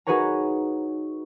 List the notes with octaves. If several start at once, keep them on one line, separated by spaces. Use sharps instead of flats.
D#4 F#4 G#4 B4 C#5 A#5